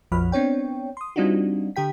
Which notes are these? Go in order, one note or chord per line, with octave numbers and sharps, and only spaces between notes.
A#1 F2 F3 B5 F6
B3 C4 D4 C#5 G5
C6 D#6
G3 C4 D4 D#4 F4 F#4
D3 G4 G5 B6